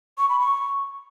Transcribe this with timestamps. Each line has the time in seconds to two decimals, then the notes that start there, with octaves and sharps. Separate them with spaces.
0.18 C#6
0.29 B5
0.40 C#6